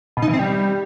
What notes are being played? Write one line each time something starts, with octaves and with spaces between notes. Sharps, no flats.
B2
D#4
E3
C4
G3